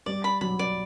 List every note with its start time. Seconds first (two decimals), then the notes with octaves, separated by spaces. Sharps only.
0.06 G3 D5
0.24 B5
0.41 F#3 B5
0.59 D5